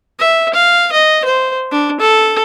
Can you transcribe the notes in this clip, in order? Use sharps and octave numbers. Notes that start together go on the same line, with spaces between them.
E5
F5
D#5
C5
D4
A4